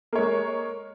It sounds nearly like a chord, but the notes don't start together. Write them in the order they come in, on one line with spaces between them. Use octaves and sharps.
A#3 C#5 G#3